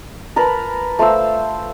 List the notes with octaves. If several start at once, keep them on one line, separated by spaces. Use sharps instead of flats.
A#4 B4 A5 B5
A3 C5 F5 E6